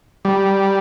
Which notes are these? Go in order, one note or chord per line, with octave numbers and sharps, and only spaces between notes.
G3